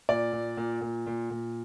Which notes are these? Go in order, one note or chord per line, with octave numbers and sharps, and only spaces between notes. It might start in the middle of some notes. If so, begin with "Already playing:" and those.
A#2 D5
A#2
A#2
A#2
A#2
A#2